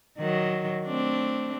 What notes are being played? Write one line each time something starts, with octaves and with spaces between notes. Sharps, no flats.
D#3 F#3
A3 C4 D4